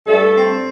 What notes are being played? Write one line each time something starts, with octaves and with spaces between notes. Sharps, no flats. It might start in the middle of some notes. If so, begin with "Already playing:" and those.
G2 A3 A4
C4